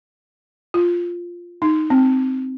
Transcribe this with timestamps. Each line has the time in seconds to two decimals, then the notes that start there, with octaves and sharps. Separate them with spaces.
0.74 F4
1.62 D#4
1.90 C4